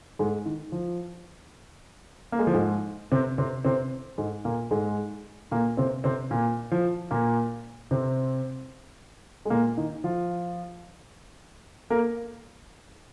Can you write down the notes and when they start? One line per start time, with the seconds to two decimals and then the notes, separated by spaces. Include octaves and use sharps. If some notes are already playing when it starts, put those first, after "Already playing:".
0.19 G#2 G#3
0.45 D#3
0.72 F3
2.32 A#3
2.39 G#3
2.47 F3
2.53 G#2 G#3
3.12 C3 C4
3.38 C3 C4
3.65 C3 C4
4.18 G#2 G#3
4.45 A#2 A#3
4.71 G#2 G#3
5.51 A#2 A#3
5.77 C3 C4
6.04 C3 C4
6.31 A#2 A#3
6.71 F3
7.11 A#2 A#3
7.91 C3 C4
9.45 G#3
9.50 A#2 A#3
9.77 D#3 D#4
10.04 F3 F4
11.90 A#3 A#4